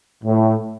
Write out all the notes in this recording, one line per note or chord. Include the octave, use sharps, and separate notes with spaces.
A2